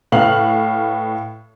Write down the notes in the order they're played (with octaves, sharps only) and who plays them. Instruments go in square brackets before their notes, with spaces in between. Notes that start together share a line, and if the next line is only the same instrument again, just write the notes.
[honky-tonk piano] A2 B4 F5 F6 F#7